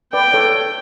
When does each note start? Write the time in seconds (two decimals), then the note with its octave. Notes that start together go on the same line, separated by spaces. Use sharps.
0.13 B4 D5 G5
0.33 A4 C#5